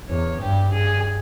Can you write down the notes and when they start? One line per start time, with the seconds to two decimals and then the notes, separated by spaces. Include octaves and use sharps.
0.08 E2 C#5
0.41 G2 G4
0.72 G2 G#4